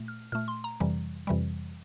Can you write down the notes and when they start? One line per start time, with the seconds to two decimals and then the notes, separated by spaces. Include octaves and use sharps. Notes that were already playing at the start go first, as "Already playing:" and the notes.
Already playing: A#2 A3
0.08 F6
0.32 A#2 A3 F6
0.48 C6
0.64 A#5
0.80 F2 C3 E3 G3
1.27 F2 C3 E3 G3